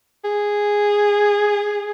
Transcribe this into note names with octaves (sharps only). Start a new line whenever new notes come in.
G#4